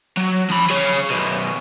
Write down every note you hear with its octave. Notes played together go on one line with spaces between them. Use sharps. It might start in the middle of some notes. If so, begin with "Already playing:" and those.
F#3
F3 B5
G#4 C#5
F#2 B2